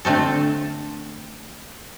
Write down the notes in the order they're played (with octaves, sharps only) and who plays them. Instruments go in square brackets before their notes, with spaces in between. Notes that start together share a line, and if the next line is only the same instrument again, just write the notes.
[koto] D3 A3 C4 A4